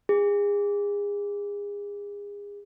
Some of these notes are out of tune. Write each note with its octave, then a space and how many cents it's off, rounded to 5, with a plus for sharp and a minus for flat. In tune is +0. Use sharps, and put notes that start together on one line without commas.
G#4 -30